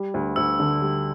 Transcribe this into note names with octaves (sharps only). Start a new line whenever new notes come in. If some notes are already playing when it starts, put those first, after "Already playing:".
Already playing: G3
D2
D2 E6
D3
G3